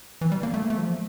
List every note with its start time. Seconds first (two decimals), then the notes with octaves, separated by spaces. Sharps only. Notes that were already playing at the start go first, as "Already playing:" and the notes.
0.21 E3
0.32 G3
0.43 A#3
0.54 A3
0.62 A#3
0.70 A3
0.78 F3